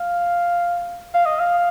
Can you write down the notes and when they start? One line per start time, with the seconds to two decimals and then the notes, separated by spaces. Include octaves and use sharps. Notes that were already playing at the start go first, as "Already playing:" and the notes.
Already playing: F5
1.14 F5
1.26 D#5
1.39 F5